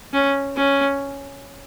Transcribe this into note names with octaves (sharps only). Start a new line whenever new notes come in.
C#4
C#4